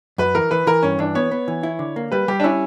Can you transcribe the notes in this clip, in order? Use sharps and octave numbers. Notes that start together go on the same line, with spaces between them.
F#2 B4
E3 A#4
E3 B4
E3 A#4
G2 C#4
E3 D4
B3 C#5
B3
E3
E4
D3
A#3
G3 B4
G3 G4
D4
C#4 E4